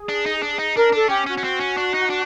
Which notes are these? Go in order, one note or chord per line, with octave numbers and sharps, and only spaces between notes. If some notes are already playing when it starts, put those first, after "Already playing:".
Already playing: G#4
D4
D#4
D4
D#4
D4 A#4
D4 A4
C#4 G4
C#4 F#4
C#4
C4
C#4
D4
D#4
D4